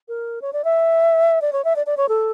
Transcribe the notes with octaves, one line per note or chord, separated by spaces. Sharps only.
A#4
C#5
D5
E5
D5
C#5
E5
D5
D5
C#5
A4